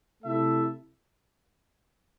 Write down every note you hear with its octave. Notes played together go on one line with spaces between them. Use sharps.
C3 A3 E4 A4 E5